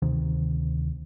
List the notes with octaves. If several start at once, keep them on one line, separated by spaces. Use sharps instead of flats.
D2 C3 D#3 C4